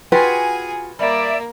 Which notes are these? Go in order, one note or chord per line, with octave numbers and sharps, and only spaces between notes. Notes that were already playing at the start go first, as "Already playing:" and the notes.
F4 F#4 G#4 B4 G5 G#5
G3 A#3 D5 E5